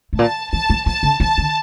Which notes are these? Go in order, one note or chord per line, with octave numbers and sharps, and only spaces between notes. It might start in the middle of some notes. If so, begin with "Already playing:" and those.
A2
A#2 A5
E3 A5
F3
F3 A5
D3
F3 A5
D3